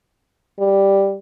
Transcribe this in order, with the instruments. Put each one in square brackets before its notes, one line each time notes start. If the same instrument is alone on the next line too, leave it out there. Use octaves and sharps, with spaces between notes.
[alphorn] G3